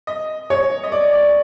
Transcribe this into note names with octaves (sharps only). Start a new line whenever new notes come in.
D#5
C#5
D#5
D5
D5